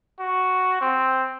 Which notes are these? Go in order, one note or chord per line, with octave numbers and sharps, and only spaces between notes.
F#4
C4